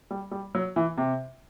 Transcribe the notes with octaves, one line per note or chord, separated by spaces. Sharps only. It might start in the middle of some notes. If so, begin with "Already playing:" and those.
G3
G3
F#3
E3
C3